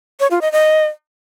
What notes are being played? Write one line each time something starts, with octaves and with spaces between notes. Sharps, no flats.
C#5
F4
D#5
D#5